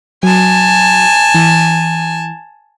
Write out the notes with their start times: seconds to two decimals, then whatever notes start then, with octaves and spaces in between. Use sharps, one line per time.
0.23 F#3 G#5 A5
1.34 E3